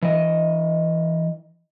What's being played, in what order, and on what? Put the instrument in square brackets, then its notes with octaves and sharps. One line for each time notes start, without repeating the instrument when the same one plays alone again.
[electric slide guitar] E3 D#5